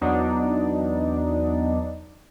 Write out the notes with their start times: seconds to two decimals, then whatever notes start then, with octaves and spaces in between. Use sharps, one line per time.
0.01 E2 F#3 B3 D4 D#4